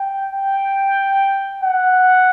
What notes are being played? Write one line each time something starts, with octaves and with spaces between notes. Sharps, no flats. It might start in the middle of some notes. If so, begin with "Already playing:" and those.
Already playing: G5
G5
F#5